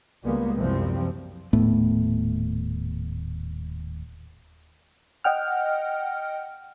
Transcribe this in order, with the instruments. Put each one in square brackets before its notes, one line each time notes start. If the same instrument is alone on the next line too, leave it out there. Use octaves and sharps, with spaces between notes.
[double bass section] C#2 G3 G#3 A#3 B3
F#1 C2 C3 F3 G3 C4
[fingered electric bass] D#1 A2 A3 B3
[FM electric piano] D#5 F#5 G5 F6